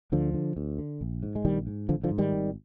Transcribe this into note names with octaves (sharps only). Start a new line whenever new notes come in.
D2 D3 F3
D3
D2
D3
A#1
G#2
G#3
A#1 D#3 G3
G#2
G#1 D3 F3
D3 F3
G#2
D#3 G3
G#1